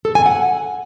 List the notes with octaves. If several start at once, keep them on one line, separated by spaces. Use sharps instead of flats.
A4
G#5
F#5